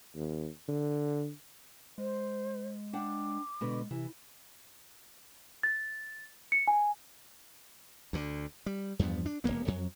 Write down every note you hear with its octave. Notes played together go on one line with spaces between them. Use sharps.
D#2
D3
G#3 C5
D4 F#5 G5 D6
B2 D3 G#3 B4
C3 E3
A6
C#7
G#5
D2 D3
G3
E2 G2 F3 B3
D4
D#1 F2 A#3 B3
F2 F#3